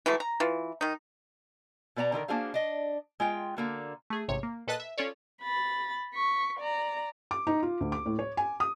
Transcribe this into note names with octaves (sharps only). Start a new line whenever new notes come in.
E3 F#3 G#3 A3
A#5
E3 F4
D#3 D#4
B2 B3 D5 G#5 A#5
D3 D#3 F4 A#4
A#3 D4 F#4 G#4 C5 F5
D4 D#5
G#3 F4 G5
D3 A#3 F#4
A3 G#4
A1 G#2 C3 C#5
A#3
A#2 A4 B4 D#5 A5 F#6
E5
C#4 F4 A4 C#5 D5
B5 A6
C#6 B6
D5 A#5
D6
D#4
F4
D2
D6
A2
C#5
G#5
D#6